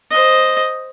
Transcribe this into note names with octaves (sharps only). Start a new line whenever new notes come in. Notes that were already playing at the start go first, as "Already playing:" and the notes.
C5 D#5